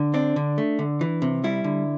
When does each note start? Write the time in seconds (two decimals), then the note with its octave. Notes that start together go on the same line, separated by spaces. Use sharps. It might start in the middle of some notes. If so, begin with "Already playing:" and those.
Already playing: D3
0.14 C4 D4
0.36 D3
0.58 A3
0.79 D3
1.01 E3
1.22 C3
1.44 G3 E4
1.64 D3